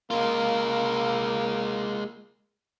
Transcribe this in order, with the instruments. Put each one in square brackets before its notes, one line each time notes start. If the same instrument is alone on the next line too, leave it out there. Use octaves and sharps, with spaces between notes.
[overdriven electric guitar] G#3 F4 [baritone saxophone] A#3